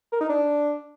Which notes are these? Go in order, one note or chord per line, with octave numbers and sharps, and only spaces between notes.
A#4
D#4
D4